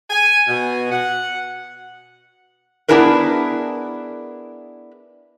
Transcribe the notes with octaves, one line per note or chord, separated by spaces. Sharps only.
G#5
B2
F#5
B3 D4 E4 G#4 A#4 B4